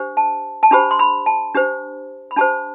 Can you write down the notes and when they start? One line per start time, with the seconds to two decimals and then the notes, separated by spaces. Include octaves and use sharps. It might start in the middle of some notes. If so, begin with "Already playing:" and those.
Already playing: D4 G4 C5
0.17 A5
0.63 A5
0.71 D4 G4 C5 B5
0.91 C6
0.99 B5
1.26 A5
1.54 D4 G4 C5
2.31 B5
2.37 D4 G4 C5 A5